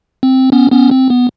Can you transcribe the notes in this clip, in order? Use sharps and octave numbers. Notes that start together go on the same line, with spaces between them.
C4
B3 C#4
B3 C#4
C4
B3